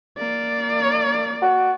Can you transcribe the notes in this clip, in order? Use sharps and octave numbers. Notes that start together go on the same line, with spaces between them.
A#3 D5
F#4